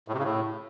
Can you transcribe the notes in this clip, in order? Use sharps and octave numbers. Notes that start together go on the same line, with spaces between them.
A2
C3
C#3
A2